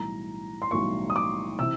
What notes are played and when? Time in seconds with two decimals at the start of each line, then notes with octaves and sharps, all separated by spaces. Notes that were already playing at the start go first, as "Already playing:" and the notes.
Already playing: B1 A2 E3 G3 A#5
0.62 C6
0.71 B1 A2 E3 G3 C#6
1.10 D#6
1.16 D6
1.59 C3 E3 E6